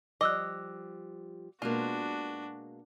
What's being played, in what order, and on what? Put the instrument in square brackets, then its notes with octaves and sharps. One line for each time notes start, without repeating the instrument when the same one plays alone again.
[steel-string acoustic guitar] F3 G3 [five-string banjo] D#5 [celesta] D6 E6 F#6
[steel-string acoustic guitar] B2 G#3 A#3 [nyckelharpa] D4 F#4 [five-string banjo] F4